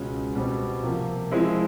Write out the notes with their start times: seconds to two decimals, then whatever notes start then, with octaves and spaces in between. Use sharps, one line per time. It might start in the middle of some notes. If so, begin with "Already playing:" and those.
Already playing: C#2 B2 G#3 C#4
0.35 B2 G3 C4
0.83 C3 F3 A#3
1.31 F3 G#3 C4 E4